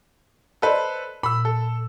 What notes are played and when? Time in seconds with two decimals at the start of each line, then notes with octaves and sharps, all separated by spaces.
0.62 A4 B4 C5 D5 D#5
1.23 A#2 B5 E6
1.45 A4